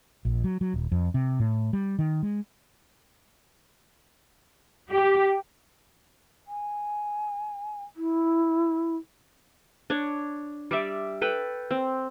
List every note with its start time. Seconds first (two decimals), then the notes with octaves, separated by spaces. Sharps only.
0.25 A#1
0.44 F#3
0.61 F#3
0.74 D#1
0.92 F2
1.14 C3
1.40 A2
1.73 G3
1.99 D#3
2.23 G#3
4.92 G4
6.46 G#5
7.96 E4
9.90 D4 C#5
10.71 G3 D5 E5
11.21 A4 B4 G5
11.71 C4